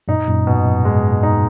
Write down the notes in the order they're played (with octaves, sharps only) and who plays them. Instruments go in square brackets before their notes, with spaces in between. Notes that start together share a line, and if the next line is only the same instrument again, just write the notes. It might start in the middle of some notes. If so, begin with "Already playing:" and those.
[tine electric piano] F#2 A#2 [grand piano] D#4
[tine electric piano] F#2 A#2
[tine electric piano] G#2 [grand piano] B2
[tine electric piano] F#2
[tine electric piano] G#2 [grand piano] G#3
[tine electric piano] G#2 [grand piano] D#4